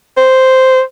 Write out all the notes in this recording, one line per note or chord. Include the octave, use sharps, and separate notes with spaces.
C5